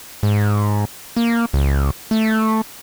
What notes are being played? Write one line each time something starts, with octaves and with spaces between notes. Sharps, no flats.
G#2
A#3
C#2
A3